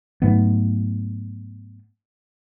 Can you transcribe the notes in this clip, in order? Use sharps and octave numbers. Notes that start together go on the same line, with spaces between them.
G#2 F#3 A3 B3